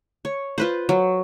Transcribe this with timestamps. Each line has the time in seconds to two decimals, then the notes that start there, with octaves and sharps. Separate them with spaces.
0.25 C#5
0.58 F4 B4 C5
0.89 F#3